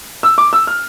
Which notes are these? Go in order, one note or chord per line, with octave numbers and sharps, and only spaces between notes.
E6
D6
E6
F6